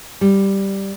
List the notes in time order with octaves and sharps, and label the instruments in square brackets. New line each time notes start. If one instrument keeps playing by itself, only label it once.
[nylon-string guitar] G3